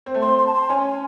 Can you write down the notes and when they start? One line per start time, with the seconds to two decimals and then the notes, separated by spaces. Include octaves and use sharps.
0.06 C4
0.14 A3
0.21 C4 C6
0.38 C6
0.47 A5
0.54 C6
0.69 C#4 G#5
0.85 G#5